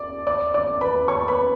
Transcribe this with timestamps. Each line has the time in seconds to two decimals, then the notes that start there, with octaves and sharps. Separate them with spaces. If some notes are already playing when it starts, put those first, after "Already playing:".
Already playing: D5 D6
0.27 D5 D6
0.54 D5 D6
0.81 B4 B5
1.08 C#5 C#6
1.28 B4 B5